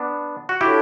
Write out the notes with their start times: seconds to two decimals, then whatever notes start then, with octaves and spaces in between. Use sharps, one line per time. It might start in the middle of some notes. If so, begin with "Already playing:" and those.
Already playing: B3 D4
0.49 F#4
0.61 D4 E4 F#4 G4 A4 C#5